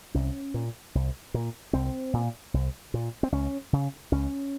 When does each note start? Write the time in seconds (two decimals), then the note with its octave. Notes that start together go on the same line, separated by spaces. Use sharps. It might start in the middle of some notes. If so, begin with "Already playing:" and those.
0.14 C2 C#4
0.54 A#2
0.95 C2
1.34 A#2
1.73 C2 C4
2.13 A#2
2.54 C2
2.94 A#2
3.23 C4
3.32 C#2 C#4
3.73 C#3
4.12 C#2 C#4